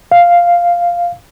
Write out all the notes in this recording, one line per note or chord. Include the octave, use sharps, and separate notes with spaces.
F5